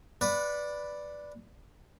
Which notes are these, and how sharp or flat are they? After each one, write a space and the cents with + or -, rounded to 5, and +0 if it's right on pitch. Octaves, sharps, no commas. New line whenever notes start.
B4 +0 D5 +0 F#5 -25